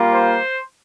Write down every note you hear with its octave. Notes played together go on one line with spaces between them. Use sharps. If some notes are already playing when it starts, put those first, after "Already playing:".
Already playing: G3 A#3 F4
C5